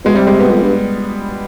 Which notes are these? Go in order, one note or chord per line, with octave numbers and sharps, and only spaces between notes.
B2 G#3
C3 G3
G#3
B3
F2
G2